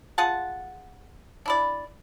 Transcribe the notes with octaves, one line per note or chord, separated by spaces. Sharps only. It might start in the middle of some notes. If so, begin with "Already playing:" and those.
F4 G#4 F#5 A5
D4 E4 D5